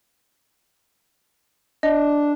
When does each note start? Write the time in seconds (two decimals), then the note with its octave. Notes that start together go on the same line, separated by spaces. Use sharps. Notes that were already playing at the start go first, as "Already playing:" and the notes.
1.83 D4 D#5